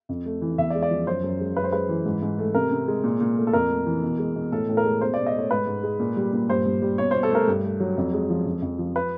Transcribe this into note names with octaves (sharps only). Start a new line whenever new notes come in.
F2
A3
E3
E2 E5
D5
G#3
D5
F3
F#2 C5
F#2
G#3
F#2 B4
C5
G#3 B4
E3
G#2
G#2
A3
C3 A#4
C3
G#3
A#2
A#2
A3
A4
F2 A#4
A3
E3
B2
G#3
B2
A2 A4
A2
A#4
G#3
B2 C5
B2 D5
D#5
A3 C#5
G#2 B4
G#2
G#3
A#2
G3
A#2
G2 C5
G2
G3
B2 C#5
B2 C5
A4
A3 A#4
G2
A3
F#3
F2
G#3
F3
F2
F2
F3
B4